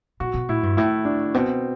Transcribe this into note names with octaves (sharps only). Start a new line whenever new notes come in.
B2 F#4
B2
A2 E4
G2
A2 E4
D4
B2 C4